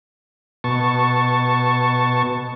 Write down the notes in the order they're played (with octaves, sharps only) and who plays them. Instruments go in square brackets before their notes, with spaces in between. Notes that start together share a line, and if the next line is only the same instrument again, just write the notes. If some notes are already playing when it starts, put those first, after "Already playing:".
[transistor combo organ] B2 A5 C#6